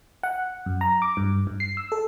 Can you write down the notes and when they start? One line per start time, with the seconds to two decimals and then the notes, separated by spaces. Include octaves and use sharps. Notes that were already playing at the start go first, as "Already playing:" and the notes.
0.23 F#5
0.66 F#2
0.81 A#5
1.02 D6
1.17 G2
1.47 G2
1.60 C7
1.77 E6
1.92 A4